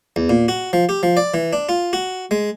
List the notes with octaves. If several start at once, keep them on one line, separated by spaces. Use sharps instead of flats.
E2
A#2
F#4
F3
G4
F3
D5
E3
D4
F4
F#4
G#3